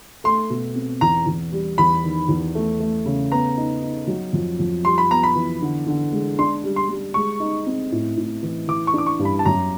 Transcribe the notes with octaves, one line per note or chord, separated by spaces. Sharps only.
A3 C6
B2
C4
E2 A#5
E2
G3
E2 B5
D#3
E2
A3
A3
C#3
B3 A#5
D#4
D#4
F#3
F2
F2
G3 C6
B5
B3 A#5
B5
E3
D3
D3
G#3
D4 C6
G3
C6
G3
G#3 C#6
D#4
C4
A2
A2
E3
E3 D6
C#6
D4 D6
C#6
G2
B5
A5
F#2 A#5